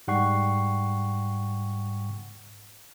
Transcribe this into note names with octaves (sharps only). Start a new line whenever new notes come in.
G#2 G3 F#5 G5 C#6 C7